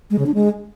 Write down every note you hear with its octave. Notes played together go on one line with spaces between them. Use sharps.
G#3
C#3
D4
G#3